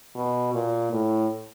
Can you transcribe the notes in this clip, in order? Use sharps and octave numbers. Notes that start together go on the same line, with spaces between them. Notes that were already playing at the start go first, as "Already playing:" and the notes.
B2
A#2
A2